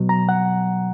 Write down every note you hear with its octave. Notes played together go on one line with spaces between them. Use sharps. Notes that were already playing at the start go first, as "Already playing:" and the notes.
Already playing: B2 F#3
A#5
F#5